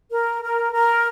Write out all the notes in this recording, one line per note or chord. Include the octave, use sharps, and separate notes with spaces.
A#4
A#4
A#4